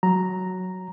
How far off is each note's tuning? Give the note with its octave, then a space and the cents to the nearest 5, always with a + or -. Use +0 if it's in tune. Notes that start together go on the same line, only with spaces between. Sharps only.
F#3 +0 A#5 +0